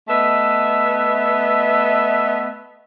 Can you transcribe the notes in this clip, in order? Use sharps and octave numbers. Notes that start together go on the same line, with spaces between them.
A3 B3 D#5 E5